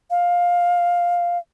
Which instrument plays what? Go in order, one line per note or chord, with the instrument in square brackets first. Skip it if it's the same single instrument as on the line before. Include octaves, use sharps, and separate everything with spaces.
[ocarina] F5